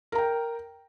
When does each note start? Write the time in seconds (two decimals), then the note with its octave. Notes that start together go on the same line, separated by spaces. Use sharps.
0.12 A#4
0.15 A#5
0.18 G5